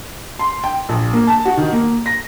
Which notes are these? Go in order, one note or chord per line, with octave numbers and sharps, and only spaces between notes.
C6
G5
A#1
A#3
A5
F#4
D#3
A#3
A#6